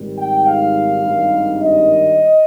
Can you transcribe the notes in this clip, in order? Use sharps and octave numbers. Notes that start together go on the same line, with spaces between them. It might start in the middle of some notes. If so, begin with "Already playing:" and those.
Already playing: G#1 G#2 G3
G5
F5
G#1 G2 D#3 G3
D#5